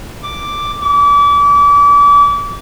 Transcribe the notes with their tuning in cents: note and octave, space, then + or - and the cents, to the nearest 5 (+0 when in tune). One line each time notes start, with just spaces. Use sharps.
D6 +0
D6 -35